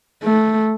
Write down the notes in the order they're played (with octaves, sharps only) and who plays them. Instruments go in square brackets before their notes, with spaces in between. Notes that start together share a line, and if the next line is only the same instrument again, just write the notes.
[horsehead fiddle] A3